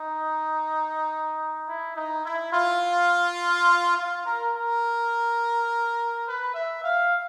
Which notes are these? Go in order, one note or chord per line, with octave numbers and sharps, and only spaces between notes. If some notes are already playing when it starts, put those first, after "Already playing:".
Already playing: D#4
E4
D#4
E4
F4
F4
A#4
A#4
B4
E5
F5